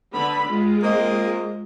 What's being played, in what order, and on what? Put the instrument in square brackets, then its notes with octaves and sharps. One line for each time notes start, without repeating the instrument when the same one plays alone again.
[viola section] D3 B3 B5
G#3 F4
[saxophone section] A#3 C4 D#5